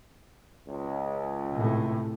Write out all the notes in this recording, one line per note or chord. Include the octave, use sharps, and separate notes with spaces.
C#2
A2 C3